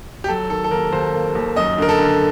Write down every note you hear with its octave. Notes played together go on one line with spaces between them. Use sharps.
G4
F#3 A4
D#3 A4
A4
D#2 A#4
D#2 C5
A#3
D#2
F#2 D#5
D3 A#4
A4
D3